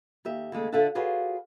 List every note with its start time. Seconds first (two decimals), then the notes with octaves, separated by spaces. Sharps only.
0.25 D#2 G4 E5
0.52 D#2 C#3 G#3 A3
0.72 D3 F4 A4 E5 F#5 A5
0.95 F4 F#4 G#4 B4 C#5 D5